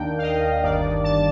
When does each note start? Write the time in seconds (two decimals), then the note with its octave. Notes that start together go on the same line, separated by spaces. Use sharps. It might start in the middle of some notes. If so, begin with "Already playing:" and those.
Already playing: D#2 D#3 A#3 D4 G5
0.18 F5
0.22 D#5
0.63 G1 G2 D#3 A#3 D4 D5
1.04 A5